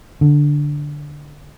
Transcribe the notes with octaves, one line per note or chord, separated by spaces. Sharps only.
D3